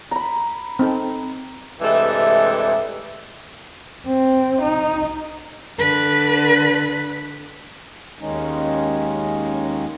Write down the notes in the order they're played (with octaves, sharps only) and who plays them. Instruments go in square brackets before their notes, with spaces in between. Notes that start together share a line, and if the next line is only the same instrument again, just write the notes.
[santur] A#5 B5
[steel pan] C4 D#4 A4
[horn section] G2 C3 E3 G#3 A3
[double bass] C4
D#4
[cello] D3 B4
[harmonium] D#2 D#3 G#3 C#4 D#4